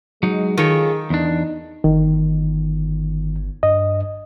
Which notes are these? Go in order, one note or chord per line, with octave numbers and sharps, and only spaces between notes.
F#3 G#3 D#4
D#3 F4 G#4 A4 C#5
E2 D4 D#4
G1 D#3
G2 D#5